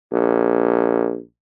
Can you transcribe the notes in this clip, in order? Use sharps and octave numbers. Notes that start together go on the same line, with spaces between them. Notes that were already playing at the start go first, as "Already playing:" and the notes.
A#1